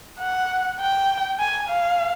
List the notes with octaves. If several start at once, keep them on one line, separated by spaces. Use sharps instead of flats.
F#5
G5
G#5
F5